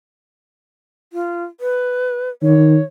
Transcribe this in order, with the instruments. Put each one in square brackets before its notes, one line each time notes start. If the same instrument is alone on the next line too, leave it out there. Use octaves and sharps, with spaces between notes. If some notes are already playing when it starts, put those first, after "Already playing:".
[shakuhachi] F4
B4
[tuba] D#3 [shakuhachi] C#5